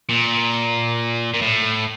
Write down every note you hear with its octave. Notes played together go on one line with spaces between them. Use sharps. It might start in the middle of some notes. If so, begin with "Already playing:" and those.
A#2
A#2
A2